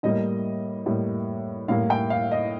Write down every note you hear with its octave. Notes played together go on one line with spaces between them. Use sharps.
A2 G3 A#3 D#5
A2 G3 A#3
A2 G3 A#3 F5
G5
F5
D#5